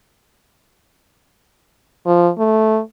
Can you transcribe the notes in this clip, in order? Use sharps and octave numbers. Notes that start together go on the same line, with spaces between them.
F3
A3